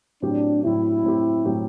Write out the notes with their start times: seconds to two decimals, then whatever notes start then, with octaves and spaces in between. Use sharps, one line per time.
0.22 A2 F#3 C4 D4 G4
0.63 A2 F#3 C4 E4 G4
1.04 A2 F#3 C4 G4
1.45 A2 F#3 C4 G4